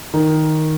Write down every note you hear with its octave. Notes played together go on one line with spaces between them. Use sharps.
D#3